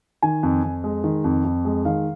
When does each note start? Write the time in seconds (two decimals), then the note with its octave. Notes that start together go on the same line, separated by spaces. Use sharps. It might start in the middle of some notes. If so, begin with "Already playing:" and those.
0.22 D#3 G#5
0.43 F2
0.63 F2
0.84 G#3
1.04 D#3
1.24 F2
1.45 F2
1.65 G#3
1.85 D#3 F5